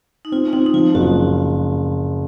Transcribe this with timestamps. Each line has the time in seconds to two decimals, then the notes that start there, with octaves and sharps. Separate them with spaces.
0.25 D#4
0.32 C4 F4
0.53 C4 D#4
0.66 D#4
0.74 F3 F4
0.95 F#1 F#4